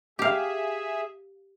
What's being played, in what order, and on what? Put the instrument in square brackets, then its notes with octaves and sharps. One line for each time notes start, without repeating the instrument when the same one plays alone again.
[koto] G4 F5 [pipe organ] G#4 E5